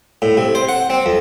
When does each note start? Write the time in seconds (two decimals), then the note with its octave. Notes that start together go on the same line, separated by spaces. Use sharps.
0.22 A2
0.37 C3
0.55 C5
0.69 F#5
0.90 C4
1.06 F2